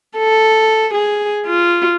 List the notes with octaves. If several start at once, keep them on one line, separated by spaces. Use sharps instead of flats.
A4
G#4
F4